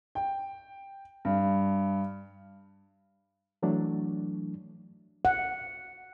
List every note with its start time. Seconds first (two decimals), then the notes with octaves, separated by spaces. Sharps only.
0.15 G5
1.25 G2
3.63 E3 F#3 A3 D4
5.25 F#5